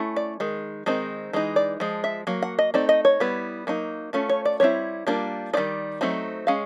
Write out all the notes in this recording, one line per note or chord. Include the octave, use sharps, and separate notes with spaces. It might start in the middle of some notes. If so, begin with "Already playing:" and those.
Already playing: A3 C#4 E4
D5
D#3 G#3
D#3 G#3 C4 D#4
E3 G#3 D#4
D5
F3 G#3
E5
F#3 A#3
F#5
D#5
A3 C4 D#4 D5
D#5
C#5
G3 B3 E4
F#3 A#3 D#4
A3 C#4 F4
C#5
D5
G3 C4 E4 C#5
G3 A#3 D4 F4
D#3 G3 C4 D#4 D5
F#3 A3 C4 D#4
G#3 C#4 F5